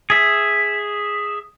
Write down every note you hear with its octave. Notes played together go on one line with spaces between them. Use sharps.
G#4 E5